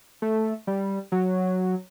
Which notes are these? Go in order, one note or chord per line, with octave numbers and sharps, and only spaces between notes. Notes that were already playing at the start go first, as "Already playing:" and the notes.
A3
G3
F#3